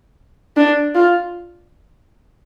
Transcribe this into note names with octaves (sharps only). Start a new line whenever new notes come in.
D4
F4